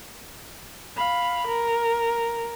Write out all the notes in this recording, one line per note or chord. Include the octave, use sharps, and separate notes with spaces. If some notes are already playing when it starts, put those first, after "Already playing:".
F5 B5
A#4